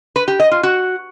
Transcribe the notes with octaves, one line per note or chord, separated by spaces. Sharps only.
B4
G4
D#5
F4
F#4